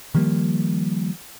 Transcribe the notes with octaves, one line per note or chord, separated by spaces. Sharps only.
D#3 F3 G3 A#3